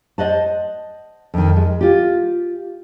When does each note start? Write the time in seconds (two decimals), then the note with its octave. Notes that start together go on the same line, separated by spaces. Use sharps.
0.18 C5 D#5 F#5 A5
1.34 F2 D#3
1.56 G#3
1.81 F4 G4